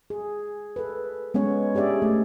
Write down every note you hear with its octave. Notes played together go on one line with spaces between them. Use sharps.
G#4
A4 B4
G#3 B3 C#4 C#5
D4 G4 G#4 D5 E5
A3